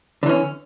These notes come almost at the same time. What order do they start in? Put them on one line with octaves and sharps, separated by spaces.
D3 E3 C#4